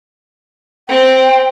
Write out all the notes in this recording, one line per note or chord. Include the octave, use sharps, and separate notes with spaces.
C4 G5